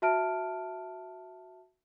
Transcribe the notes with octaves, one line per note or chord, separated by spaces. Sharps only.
F#4 E5 A5 F6 D7